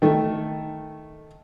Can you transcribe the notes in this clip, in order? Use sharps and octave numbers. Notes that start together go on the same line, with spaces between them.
D#3 A3